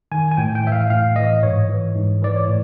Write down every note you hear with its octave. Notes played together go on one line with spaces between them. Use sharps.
D#3 G#5
G#5
A2 G5
G5
E3 E5
F5
A2 F5
E3 D#5
G#2 C#5
E3
G#2
E3 D5
C#5
A2